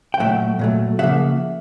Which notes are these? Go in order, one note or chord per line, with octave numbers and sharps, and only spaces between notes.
G5
A#2 F#3 A3 E5 F#5
A#2 F#3 A3
C#3 F3 A#3 E5 F#5